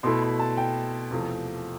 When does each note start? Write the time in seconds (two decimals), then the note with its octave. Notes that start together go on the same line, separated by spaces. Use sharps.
0.03 B2 A3 E4 C6
0.22 B5
0.39 A5
0.57 G5
1.11 E2 C3 F3 A3